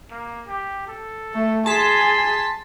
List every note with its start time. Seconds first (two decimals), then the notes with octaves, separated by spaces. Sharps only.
0.11 A#3
0.47 G4
0.87 A4
1.34 A3
1.66 G#4 A5 C6 B6